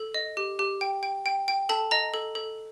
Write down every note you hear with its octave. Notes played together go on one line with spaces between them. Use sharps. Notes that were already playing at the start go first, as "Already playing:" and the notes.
Already playing: A4
D#5
G4
G4
G5
G5
G5
G5
A4 A5
D#5 A#5
A4
A4